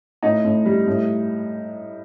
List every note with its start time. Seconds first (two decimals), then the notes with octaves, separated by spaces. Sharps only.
0.23 A2 D#4
0.44 A2
0.66 G3
0.87 A2